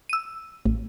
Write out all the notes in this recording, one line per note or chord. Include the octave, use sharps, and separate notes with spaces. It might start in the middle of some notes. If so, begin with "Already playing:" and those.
E6 D#7
A1